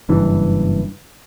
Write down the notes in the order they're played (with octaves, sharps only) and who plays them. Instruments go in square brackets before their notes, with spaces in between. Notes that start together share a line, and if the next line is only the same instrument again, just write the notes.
[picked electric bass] F#1 G2 E3